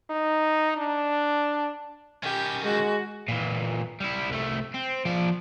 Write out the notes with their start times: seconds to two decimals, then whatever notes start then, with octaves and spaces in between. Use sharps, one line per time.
0.10 D#4
0.77 D4
2.23 D#3 C#4 G4
2.64 G#3 F#4
3.28 A#2 E3
4.00 G3 E4
4.29 C2 A3
4.75 C4
5.05 F3 D5